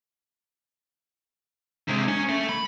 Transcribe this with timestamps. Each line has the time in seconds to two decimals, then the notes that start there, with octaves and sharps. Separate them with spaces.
1.88 C3 G#3
2.09 C#4
2.29 A3
2.49 B5